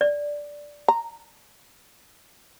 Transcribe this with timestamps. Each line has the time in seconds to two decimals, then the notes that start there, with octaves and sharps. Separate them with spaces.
0.01 D5
0.88 A#5